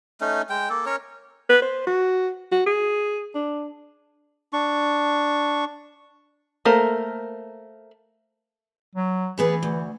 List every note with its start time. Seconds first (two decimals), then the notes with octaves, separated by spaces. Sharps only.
0.21 A3 C#4 D#4
0.49 G#3 G5
0.70 A#3 A4
0.86 C#4 A#4 C#5
1.49 B4
1.62 C5
1.87 F#4
2.52 F#4
2.66 G#4
3.35 D4
4.53 D4 C#6
6.65 A3 A#3 A#4 C5
8.95 F#3
9.38 E3 B3 G#4 B4
9.63 D2